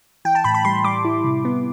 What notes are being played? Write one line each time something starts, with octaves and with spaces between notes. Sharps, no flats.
E3 G5
A5
A2 B5
B5
G3 C6
G3 D6
E4
C3
B3